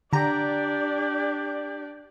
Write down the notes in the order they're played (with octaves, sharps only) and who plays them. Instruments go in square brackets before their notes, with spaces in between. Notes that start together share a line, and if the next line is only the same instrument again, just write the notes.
[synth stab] D3 A#5 [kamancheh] D4 D5 [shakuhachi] G4